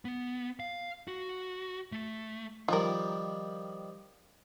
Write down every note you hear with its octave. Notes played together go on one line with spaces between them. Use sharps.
B3
F5
F#4
A3
D#3 F3 G3 F4 A#4